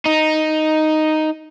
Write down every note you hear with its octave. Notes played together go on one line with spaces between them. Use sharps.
D#4